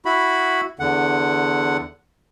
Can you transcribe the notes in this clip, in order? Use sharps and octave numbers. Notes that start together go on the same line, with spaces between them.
E4 F#4 B5
E2 D3 F#5